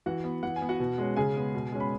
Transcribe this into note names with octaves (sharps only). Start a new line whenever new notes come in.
E3 F#4 F#5
B3
E3 F#5
G#5
B3
F#4 F#5
B2
G#3 C#4
C#3 G#4 G#5
G#3 B3
B2
G#3 C#4
B5